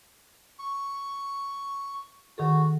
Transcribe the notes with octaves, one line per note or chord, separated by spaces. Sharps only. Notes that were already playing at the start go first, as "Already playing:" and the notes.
C#6
D#3 F#4 G#4 A4